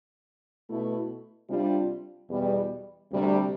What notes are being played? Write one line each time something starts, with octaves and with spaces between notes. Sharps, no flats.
B2 A3 E4
C3 G3 D4 F4
E2 B2 G3
D2 C3 G3